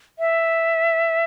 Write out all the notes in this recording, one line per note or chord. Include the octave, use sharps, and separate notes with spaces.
E5